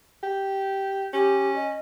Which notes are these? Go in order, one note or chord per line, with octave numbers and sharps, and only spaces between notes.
G4
C#4 G4
D#5